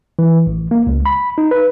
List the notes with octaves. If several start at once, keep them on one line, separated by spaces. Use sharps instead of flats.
E3
A1
A#3
C#2
B5
D#4
B4